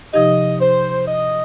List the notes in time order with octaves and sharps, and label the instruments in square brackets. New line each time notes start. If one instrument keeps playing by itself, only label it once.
[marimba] C3 F3 D#4 G4 [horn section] D#5
[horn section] C5
D#5